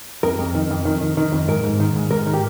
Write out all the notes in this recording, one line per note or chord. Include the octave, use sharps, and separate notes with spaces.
F2 A#4
F2
D#3
F2
D#3
D#3
D#3
F2
G#2 A#4
G#2
D#3
G#2
G#2 A#4
D#3
G4